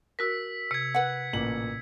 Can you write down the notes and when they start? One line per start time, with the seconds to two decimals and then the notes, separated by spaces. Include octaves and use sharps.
0.19 F#4 A#4 E6 B6
0.71 C3 G#6 C#7
0.95 B4 F#5
1.33 A1 A#2 F#7